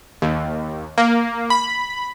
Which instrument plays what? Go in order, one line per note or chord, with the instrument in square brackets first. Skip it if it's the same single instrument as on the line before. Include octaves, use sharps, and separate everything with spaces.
[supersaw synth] D#2
A#3
B5